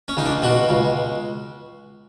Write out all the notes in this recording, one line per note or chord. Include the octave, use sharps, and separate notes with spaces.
C#4
C#2 D#4
D4
B2 F#4
C#2